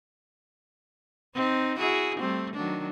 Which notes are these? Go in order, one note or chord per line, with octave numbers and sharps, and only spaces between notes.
C4 D#4
E4 F#4 G#4
G3 A3 C4
D#3 F#3 D4